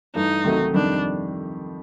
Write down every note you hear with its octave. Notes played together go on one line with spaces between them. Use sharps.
G2 E3 A3 D#4
D2 C3 D#3 F#3 A3
F2 C3 D#3 G3 D4